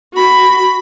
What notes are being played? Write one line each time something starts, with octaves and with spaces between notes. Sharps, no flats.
F#4 B5